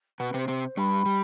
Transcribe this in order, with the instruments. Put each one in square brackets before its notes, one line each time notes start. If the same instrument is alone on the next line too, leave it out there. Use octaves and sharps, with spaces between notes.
[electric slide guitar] B2 B3 [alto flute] B4
[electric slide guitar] C3 C4
[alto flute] C5
[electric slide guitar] C3 C4
[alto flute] C5
[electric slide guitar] G2 G3 [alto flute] B5
[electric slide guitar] G3